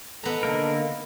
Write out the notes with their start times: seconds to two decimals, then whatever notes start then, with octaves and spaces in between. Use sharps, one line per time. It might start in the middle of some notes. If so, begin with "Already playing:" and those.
0.24 D#3 B3 A4 A#5
0.43 D3 A#3 A#4